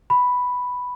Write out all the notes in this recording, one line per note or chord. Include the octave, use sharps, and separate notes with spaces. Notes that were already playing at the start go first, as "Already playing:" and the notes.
B5